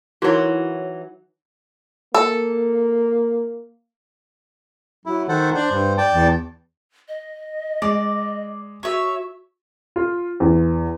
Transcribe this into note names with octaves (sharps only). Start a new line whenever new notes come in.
E3 F#3 A#3 D#4 E4 F#4 C#5
A#3 A4
F#3 E4
D#3 A4 C5 F#5
D4 C5
G2
D5 G5 A5
E2
D#5
G#3 D5
F#4 C#5 E5
F4
E2